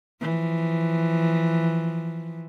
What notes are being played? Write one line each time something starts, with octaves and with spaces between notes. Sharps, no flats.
E3 F3